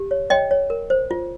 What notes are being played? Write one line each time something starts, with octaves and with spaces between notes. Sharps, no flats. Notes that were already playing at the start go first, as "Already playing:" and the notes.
Already playing: G4
C#5
C#5 D#5 G5
C#5
A#4
C5
F4